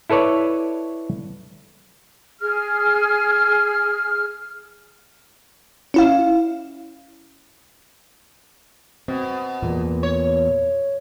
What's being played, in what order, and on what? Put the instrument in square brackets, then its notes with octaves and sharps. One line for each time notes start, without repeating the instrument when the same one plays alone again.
[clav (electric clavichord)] E4 A4 B4 C#5 D5
[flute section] G#4 F6
[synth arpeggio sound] C#4 E4 F5
[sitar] B2 [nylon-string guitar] C4
[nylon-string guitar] E2 A#2
[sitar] C#5